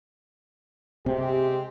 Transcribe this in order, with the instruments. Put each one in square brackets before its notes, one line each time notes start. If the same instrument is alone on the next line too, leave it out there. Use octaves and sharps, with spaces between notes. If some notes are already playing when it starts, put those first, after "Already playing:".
[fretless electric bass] C3 [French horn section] G#3 C4 G4